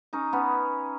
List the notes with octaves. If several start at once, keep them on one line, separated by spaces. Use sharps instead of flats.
C#4 D#4
B3 C#4